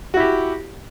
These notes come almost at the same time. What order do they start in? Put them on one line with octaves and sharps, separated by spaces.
F#4 E4 G4